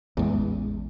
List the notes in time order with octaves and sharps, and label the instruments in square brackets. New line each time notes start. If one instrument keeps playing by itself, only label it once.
[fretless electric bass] A1 G#3 [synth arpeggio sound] E2